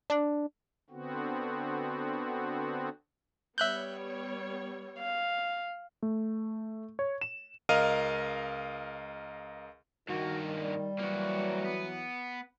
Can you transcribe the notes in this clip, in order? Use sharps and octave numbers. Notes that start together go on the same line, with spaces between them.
D4
D3 B3 C4 F#4
G3 B3 C#5 E5 F#6 G6
F5
A3
C#5
E7
C#2 A#4 D#5 F5 F6 D#7
G2 D#3 A#3 F#4
G3
E3 F#3 A#3 F#4
B3